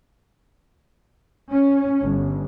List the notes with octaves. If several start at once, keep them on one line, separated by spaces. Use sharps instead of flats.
C#4
G1